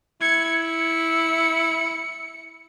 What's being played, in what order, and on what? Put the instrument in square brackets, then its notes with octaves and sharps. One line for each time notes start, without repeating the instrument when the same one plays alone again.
[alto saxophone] E4 [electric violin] G#6 C#7
[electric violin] C#7